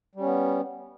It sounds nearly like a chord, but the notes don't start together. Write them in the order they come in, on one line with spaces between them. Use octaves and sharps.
G3 C#4 B3